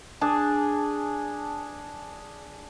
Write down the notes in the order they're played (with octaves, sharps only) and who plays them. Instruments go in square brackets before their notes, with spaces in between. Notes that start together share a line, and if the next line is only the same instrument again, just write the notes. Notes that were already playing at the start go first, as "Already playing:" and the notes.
[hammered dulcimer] D4 G#4 A5